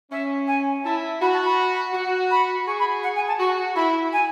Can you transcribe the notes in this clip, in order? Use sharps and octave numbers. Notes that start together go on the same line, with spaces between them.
C#4 E5
G#5
E4 A5
F#4 B5
A5
B5
F#4
B5
G#4 C#6
B5
F#5
G#5
A5
F#4 C#6
E4 B5
G#5